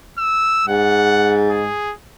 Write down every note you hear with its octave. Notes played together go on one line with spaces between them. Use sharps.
E6
G#2 F#5
G#4